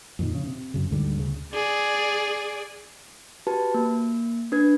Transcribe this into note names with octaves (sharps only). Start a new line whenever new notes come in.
F2 A#2 D#3
C#3
C3
F#2 C#3
D2 G#2 D3 G3
D2 C#3
G#4 D5
F#4 G4 B4 A5
A#3
D4 B4 G#6